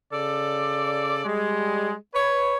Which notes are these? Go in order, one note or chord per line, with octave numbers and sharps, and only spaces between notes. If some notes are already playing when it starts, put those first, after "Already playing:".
C#3 A4 D5
G3 G#3
B4 C#5